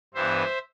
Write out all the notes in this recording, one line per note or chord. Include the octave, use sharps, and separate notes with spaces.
G2 E3 B3 C5 E5